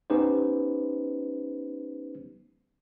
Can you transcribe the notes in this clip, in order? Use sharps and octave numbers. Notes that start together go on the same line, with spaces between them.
B3 C#4 D#4 G4 B4 C5